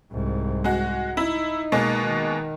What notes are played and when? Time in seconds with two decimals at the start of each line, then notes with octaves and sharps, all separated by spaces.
0.12 C2 G#2
0.64 G#3 F#4
1.17 D#4 E4
1.72 B2 G#3 A#3
2.05 D#3